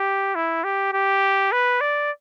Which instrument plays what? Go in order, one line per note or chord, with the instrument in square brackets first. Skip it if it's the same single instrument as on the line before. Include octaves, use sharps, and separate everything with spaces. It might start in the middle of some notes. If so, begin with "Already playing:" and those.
Already playing: [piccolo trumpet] G4
E4
G4
G4
B4
D5